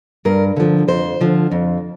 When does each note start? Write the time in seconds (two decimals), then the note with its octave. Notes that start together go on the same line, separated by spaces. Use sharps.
0.25 G2 A#4
0.57 D3 F3
0.88 F2 C5
1.21 D3 F3
1.52 F2